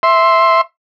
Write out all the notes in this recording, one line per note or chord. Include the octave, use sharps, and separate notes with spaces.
E5 C6